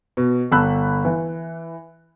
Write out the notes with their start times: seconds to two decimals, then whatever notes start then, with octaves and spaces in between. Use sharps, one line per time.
0.17 B2
0.52 G1 A5 B5 E6 F#6
1.05 E3